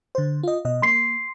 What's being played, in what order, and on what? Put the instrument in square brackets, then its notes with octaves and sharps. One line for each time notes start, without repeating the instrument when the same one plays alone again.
[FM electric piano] D3 C5
F4 D#5
B2 D#5
[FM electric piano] A#3 [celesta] C6 C7